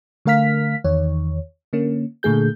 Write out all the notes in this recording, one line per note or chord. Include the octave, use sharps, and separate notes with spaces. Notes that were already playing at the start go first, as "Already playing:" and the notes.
D3 A3 A#4 F5 F6 B6
E2 D#3 C#5
D3 A#3 C#4
A#2 D3 A3 G#4 G6